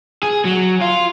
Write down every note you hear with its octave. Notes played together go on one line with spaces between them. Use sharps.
G#4
F#3
F4